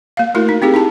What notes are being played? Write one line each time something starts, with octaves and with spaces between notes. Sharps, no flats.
A#3 F5
A3 E4 F#4 A#4
D#4
C4 D#4 G4 G#4
D#4 E4 A5